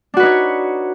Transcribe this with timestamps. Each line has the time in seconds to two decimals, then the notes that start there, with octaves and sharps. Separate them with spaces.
0.14 D4
0.17 F#4
0.20 B4
0.23 D#4
0.26 C#5